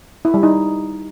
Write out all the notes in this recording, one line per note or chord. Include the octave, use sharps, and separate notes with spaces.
E4
G3
D#4